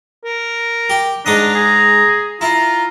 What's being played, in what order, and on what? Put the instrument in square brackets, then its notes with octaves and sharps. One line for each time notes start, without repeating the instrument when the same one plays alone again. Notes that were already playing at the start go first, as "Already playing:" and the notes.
[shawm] A#4
[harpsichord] G4
[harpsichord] G#2 D#4 D#6 [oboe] D4 [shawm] A#5
[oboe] G#4
[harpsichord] E4 [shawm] F4 [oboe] A#5